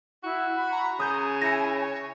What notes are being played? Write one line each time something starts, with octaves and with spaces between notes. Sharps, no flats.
E4 F#4
B5
A#5
C#3 G#5 D#6 G6
E4 A#6 C#7
C#5